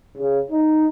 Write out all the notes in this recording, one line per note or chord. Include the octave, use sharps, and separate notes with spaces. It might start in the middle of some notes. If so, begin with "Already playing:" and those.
C#3
D#4